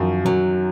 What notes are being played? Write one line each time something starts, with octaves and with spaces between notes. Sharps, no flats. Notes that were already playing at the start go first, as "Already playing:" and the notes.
Already playing: F#2 D#3 F3
F#2 F#3